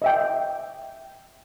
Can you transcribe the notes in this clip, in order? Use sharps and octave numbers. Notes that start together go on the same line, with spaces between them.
D#5 E5 G5